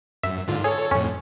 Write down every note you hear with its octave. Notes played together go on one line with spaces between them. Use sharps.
F#2 E5
G#2 D3 F4
G#4 A4 C#5
F2 A2 C#4